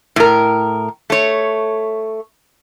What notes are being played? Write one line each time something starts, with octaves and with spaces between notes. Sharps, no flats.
A2 A#4
A3 C#5